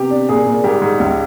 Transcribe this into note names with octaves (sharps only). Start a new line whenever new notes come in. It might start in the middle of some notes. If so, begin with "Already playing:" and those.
Already playing: C3 B3 G4
D4
A#2 G#4
A#2
G#2 G4
G#2
C#2